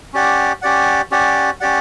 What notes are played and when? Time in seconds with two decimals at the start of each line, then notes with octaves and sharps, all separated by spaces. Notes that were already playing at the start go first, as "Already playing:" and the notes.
0.13 C#4 G4 D5 F#5
0.62 C#4 G4 D5 F#5
1.11 C#4 G4 D5 F#5
1.60 C#4 G4 D5 F#5